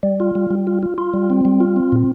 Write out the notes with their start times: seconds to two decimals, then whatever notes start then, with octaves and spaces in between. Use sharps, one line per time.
0.03 G3
0.20 F4
0.35 G3
0.50 G3
0.67 F4
0.83 F4
0.98 F4
1.14 G3
1.30 C4
1.45 G3
1.60 F4
1.76 C4
1.92 A#2